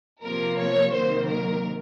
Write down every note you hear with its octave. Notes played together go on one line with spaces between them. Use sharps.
C3 F3 A#3 A#4
C#5
C3 D#3 F#3 A#3 C5
A#4